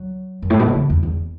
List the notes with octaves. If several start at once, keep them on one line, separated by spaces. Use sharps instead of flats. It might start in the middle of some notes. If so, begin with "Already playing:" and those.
Already playing: F#3
F#2
A2
B2
C#3
E3
E2
E2